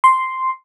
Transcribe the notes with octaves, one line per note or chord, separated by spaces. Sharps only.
C6